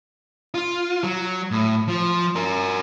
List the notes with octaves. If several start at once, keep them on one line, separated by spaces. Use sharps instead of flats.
F4
F#3
A2
F3
F#4 A#4